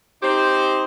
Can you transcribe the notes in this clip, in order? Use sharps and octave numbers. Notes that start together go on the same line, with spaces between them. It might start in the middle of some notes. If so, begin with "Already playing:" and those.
C4 D#4 G4 C5